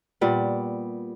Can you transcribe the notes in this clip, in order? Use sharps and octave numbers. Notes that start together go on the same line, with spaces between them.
A#2 G3 B3